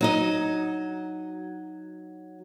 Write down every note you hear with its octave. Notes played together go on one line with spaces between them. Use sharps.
F#3 D#4 D#5